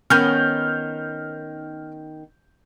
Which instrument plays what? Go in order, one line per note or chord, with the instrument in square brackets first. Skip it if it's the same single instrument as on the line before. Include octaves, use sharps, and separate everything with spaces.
[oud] D#3 B3 C#4 [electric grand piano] F6 G6